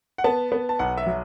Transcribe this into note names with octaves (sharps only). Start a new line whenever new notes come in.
F#5
B3 A5
B3
A5
B1 F#5
E5
F#3